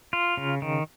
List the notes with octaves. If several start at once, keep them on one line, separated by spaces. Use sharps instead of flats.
F4
C#3
D#3